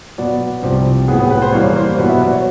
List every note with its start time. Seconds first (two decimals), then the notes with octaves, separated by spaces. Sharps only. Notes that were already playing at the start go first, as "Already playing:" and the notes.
0.18 B2 F#3 B3 D5
0.62 C2 C3 F3
1.08 A2 F#3 B3 G#4
1.20 G#4
1.31 B4
1.42 C5
1.53 G2 E3 G3 A#3 C#5
1.76 C5
1.98 B2 F#3 B3 B4
2.09 E5
2.21 D5
2.32 C#5